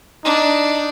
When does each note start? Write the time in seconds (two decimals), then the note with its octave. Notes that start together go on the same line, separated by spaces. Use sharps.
0.25 D4 D#4